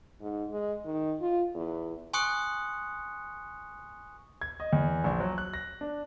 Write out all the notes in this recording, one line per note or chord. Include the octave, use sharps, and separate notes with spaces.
G#2
G#3
D#3
F4
E2
G#5 C6 C#6 D#6 F#6 C#7
G#6
D#5
E2
A#1
F#3
F#6
A#6
D4